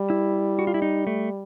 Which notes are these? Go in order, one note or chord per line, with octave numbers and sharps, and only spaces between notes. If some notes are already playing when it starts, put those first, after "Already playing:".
Already playing: G3
E4
F#4
F4
E4
D#4
A3